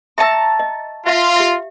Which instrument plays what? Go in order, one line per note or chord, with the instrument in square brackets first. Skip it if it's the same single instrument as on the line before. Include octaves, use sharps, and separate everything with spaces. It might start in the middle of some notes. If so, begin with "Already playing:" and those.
[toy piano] E5 E6 [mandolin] A5 A#5 C#6
[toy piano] D#5
[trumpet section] F4 [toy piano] E5 F5
[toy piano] G4 E5